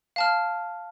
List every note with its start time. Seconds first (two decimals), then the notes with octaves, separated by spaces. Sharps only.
0.16 F5 A5 F6